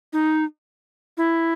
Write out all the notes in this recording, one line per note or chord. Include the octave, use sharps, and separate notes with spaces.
D#4
E4